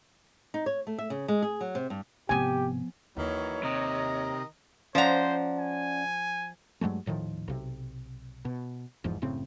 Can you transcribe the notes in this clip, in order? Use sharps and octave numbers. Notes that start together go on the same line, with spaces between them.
D#4
C#5
A3
E5
C#3
G#3
G#4
F#3
C3
G2
G#1 C3 F3 B3 G4 G#5
D#2 D#3 E3 F#3 C#5
C3 D#3 D#5 A#5
F3 C#4 C5 D5 F#5 A#5
G#5
G2 F#3 G#3 A3
D#1 A2 D#3 F3
B1 C3
B2
F#1 E2 G#2 F3
F#1 A2 C#3 C4